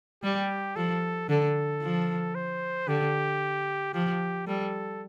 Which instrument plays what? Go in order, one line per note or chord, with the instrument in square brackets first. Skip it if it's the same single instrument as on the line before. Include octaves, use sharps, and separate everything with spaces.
[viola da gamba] G3 [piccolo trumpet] G4
[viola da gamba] F3 [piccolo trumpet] A4
[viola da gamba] D3 [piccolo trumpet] A4
[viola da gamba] F3
[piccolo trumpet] C5
[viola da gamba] D3 [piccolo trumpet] G4
[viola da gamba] F3 [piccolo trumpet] G4
[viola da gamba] G3 [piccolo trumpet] A4